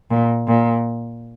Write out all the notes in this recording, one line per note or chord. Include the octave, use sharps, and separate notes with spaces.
A#2
A#2